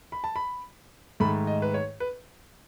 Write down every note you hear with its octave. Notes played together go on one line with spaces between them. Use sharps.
B5
A5
B5
G#2 D#3 A3 B5
D#5
B4
C#5
B4